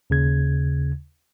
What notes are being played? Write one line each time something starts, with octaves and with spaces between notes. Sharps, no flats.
D#2 C#3 G#6